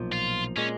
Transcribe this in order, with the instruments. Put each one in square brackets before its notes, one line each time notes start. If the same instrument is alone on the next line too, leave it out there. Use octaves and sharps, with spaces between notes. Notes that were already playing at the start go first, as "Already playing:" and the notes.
Already playing: [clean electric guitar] B1 A#2 F3
[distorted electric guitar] F4
[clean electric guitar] A#2 G#3 [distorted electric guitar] C#4